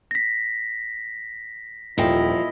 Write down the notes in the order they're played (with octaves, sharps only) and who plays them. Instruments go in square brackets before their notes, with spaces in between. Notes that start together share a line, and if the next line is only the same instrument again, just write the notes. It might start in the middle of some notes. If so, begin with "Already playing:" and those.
[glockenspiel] A#6 B6
[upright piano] D#1 G5 [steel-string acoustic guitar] E2 F3 [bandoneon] A#2 E4 D#5